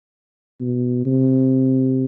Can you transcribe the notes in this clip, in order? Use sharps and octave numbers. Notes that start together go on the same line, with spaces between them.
B2
C3